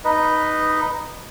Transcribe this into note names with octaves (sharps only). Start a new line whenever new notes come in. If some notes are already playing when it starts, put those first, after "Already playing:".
D#4 B4 D#5